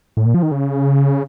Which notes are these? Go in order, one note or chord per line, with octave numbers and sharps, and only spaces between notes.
A2
A#2
F3
D#3
C#3